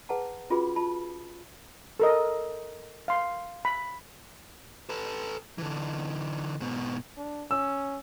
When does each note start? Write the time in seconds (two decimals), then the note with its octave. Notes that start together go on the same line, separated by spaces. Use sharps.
0.09 G#4 B4 F#5 A5 A#5
0.50 C#4 F4 F#4 G#4 B4 B5
0.76 F4 A5 B5
2.00 A4 A#4 D#5
3.08 F5 C6
3.65 B5
4.89 A4 B4
5.58 D3 E3
6.60 G#2 B2
7.17 D4
7.51 C#4 E6